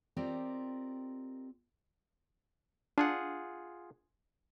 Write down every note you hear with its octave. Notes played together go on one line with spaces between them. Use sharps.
C4 F4 G4 A#4 D5 D#5
D4 F4 G#4 F#5